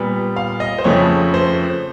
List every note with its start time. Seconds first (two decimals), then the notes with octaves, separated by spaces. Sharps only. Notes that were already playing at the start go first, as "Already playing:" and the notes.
Already playing: A#2 G3 B3
0.36 F5
0.60 D#5
0.78 C5
0.84 F2 C#3 F3 A3 C#5
1.34 C5